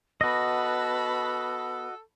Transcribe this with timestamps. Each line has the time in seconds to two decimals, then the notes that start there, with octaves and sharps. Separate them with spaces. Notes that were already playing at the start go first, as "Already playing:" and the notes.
0.21 B3 F#4 A4 D#5 A5 B5